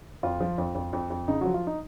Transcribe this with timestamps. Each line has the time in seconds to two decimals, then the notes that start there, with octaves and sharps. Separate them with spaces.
0.23 F2 F4
0.41 F3
0.58 F2
0.75 F2
0.93 F2
1.10 F2
1.28 C#3 D#4
1.41 F#3 F#4
1.46 F3
1.54 F4
1.67 D#4